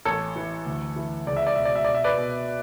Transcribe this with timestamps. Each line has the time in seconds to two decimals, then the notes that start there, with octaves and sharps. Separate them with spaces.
0.05 A1 A4 C#5
0.36 E3
0.66 D2
0.96 E3
1.27 C#2 D5
1.37 E5
1.47 D5
1.56 B2 E5
1.65 D5
1.75 E5
1.84 B2 D5
1.94 E5
2.04 B4 D5
2.17 B2